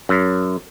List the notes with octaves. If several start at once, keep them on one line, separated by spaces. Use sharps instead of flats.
F#2